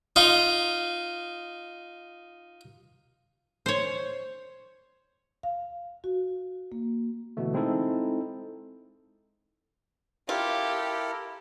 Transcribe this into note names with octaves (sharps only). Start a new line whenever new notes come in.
D#4 F4
C5 C#5
F5
F#4
A#3
B2 D3 E3 A3
G#3 C4 D#4 E4 A4
E4 F4 G4 A4 A#4